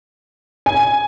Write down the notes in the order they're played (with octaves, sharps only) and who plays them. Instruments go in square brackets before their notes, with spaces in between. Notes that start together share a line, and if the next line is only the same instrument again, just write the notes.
[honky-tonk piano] G#5